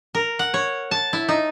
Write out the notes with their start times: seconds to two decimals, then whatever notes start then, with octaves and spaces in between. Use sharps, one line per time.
0.15 A#4
0.39 F#5
0.54 C#5
0.91 A5
1.13 E4
1.29 D#4